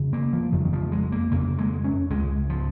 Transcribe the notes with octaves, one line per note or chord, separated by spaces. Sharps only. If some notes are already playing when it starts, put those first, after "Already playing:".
Already playing: F2 C#3
A#3
F3
F2 C#3 F3
D#3
F3
G#3
A#3
F2 C#3 A#3
G#3
C#4
C#2 C#3 G#3
F3